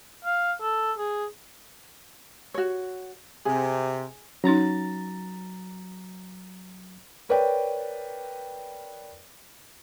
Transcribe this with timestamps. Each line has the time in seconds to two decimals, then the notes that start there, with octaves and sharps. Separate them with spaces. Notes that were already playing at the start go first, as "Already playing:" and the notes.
0.25 F5
0.61 A4
0.98 G#4
2.54 F#4 C#5
3.45 C3 G#4
4.44 F#3 C#4 D#4 A#5 A6
7.29 A#4 B4 C#5 D5 G5